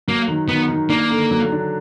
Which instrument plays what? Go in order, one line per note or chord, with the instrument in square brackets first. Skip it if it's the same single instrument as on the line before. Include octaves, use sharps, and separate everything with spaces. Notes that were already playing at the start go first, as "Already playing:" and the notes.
[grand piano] F#3 [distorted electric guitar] A#3
[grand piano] D#3
[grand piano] D#3 [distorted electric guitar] B3
[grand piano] D#3
[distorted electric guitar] A#3 [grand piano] D4
[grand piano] D3
F#3
D4